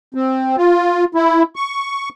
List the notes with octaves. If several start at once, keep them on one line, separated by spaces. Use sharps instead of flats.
C4
F4
E4
C#6